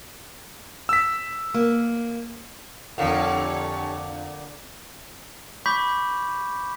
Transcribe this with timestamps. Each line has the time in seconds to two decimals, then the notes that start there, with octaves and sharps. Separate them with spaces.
0.89 E6 B6
1.54 A#3
2.98 F2 A#2 D3 G4 A4 C#5 F5
5.66 B5 C#6 D6 G6 B6